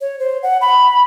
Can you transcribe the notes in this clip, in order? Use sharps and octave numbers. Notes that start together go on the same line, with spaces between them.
C#5
C5
F#5
B5